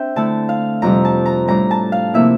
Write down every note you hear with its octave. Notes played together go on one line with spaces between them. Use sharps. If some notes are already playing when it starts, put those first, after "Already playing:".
Already playing: C4 D4 E5 G5
D3 A3 E4 A5
F5
F2 C3 G3 A#5
A5
A#5
A2 G3 D4 A#5
A5
F5
C3 F3 A#3 E4 E5